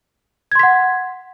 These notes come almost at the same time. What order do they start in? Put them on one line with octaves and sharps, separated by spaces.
G#6 C6 B6 F#5